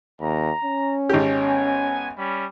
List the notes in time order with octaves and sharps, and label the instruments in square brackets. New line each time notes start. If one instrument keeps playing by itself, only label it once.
[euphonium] D#2 [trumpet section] A#5
[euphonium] C#4
[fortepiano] G#1 G4
[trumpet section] B3 G#5
G3 C#4 B5